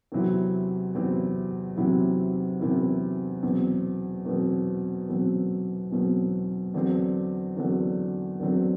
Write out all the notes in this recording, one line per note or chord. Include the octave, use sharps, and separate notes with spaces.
E2 C3 F#3 C4 E4
E2 C3 F#3 C4 E4
E2 C3 F#3 C4 E4
E2 C3 F#3 C4 E4
E2 B2 F#3 C4
E2 B2 F#3 C4
E2 B2 F#3 C4
E2 B2 F#3 C4
E2 D3 F#3 C4
E2 D3 F#3 C4
E2 D3 F#3 C4